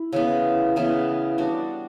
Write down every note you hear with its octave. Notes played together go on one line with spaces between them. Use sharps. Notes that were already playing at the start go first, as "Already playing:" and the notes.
Already playing: E4
C#3 E3 B3
C#3 E3 B3
G3 D4 F#4